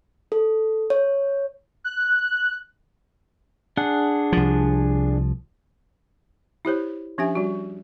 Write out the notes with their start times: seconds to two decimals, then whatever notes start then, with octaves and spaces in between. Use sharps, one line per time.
0.32 A4
0.90 C#5
1.84 F#6
3.77 D4 G#4 F#5
4.32 C2 F3
6.65 E4 G4 C5 C#5
7.18 F3 C#4 D4 G4 E5 G#5
7.35 G3 F#4